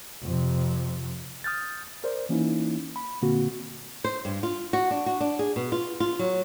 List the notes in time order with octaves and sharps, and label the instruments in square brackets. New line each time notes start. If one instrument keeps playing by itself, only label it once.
[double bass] F2 C3
[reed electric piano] D#6 F6 G6 A6
A#4 C5 D5
E3 A#3 C#4 D#4 E4
B5
A#2 D3 A#3 C4 F#4
[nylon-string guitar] C5
G2
F4
F#4
D4
F#4
D4
G#4
B2
F4
F4
F#3